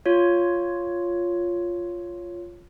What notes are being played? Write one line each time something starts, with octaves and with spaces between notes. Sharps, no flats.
F4 C#5